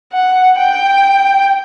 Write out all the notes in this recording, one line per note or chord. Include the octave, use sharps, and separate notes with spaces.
F#5
G5